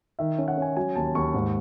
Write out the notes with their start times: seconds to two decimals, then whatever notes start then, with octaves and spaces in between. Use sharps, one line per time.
0.19 D#3 E5
0.38 C#4
0.48 F#5
0.57 C#4 G#5
0.77 F#3 G#5
0.95 D#2 A5
1.15 D#2 C#6
1.34 G#2